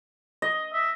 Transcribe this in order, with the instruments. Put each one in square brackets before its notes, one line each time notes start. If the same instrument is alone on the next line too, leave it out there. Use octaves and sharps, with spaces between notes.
[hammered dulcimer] D#5
[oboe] E5